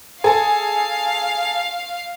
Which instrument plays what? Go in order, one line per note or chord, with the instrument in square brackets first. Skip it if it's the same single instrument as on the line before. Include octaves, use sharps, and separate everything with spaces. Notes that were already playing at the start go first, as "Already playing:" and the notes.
[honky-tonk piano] G#4 A4 [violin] F5